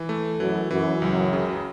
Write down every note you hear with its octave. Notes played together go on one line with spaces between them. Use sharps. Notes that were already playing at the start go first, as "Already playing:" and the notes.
Already playing: E3
A3
F#2 E3
F#2 E3
C#2 F#2
C#3